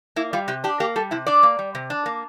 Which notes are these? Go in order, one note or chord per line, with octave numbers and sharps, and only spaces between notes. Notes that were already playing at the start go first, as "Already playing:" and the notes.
A#3 E4
G3 F4
C3 G4
D4 G4
A#3 G4
G3 A4
C3 E4
D4 D5
A#3
G3
C3
D4
A#3